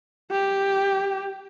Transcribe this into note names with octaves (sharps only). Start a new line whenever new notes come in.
G4